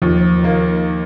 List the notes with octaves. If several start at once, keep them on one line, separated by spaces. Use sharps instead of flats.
D#2 F3
D#3 A#3